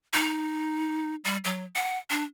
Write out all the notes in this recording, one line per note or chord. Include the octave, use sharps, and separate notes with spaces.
D#4
G3
F#3
F#5
D4